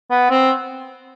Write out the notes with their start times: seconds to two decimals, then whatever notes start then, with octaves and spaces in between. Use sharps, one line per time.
0.10 B3
0.30 C4